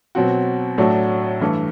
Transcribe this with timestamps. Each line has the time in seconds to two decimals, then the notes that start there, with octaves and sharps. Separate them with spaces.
0.15 B2 F#3 C4 F#4
0.78 A2 F#3 A3 D4 F#4
1.41 G2 E3 A3